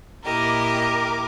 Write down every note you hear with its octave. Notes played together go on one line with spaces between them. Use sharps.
A#2 E4 G4 A#4 D#5 D6